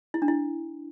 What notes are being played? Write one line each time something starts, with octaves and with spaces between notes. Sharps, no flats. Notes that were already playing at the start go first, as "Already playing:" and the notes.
E4
D4
E4